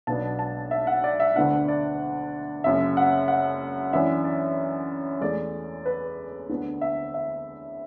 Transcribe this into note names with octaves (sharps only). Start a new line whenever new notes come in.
B1 B2 F#3 B3 D4 A5
A5
E5
F#5
D5
E5
D2 D3 B3 D4 F#5
D5
F#1 F#2 F#3 E5
F#5
F#5
F#2 E3 D4 E5
D5
E2 E3 A3 D5
B4
D2 D3 B3
E5
E5